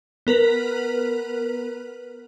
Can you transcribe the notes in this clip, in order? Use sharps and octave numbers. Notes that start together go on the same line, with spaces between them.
B3 A#4 B4 B6